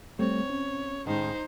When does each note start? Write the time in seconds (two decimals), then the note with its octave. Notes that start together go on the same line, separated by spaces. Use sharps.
0.19 G3 A3 C4 C#5
0.50 C#4
1.06 A2 D#3 G#3 D#4 C5